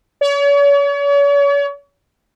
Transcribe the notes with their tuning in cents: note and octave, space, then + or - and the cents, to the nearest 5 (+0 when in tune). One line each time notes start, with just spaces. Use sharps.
C#5 +40